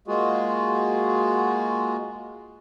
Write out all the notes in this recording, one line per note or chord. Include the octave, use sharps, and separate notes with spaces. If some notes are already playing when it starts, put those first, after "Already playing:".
G#3 A#3 F4 F#4 G#4